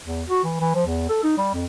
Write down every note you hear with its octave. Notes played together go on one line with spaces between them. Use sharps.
E2
F#4
E3
E3
F3
E2
A4
D#4
G3
F2